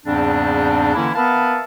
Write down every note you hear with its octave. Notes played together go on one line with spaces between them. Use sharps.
E2 G#2 C#3 G3 C4 D4
D3 E3 A#3 C#4 E4
B3 A#4 B4 E5 F5 A5